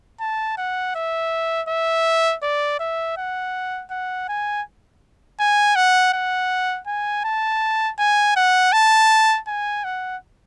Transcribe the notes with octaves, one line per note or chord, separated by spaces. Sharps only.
A5
F#5
E5
E5
D5
E5
F#5
F#5
G#5
G#5
F#5
F#5
G#5
A5
G#5
F#5
A5
G#5
F#5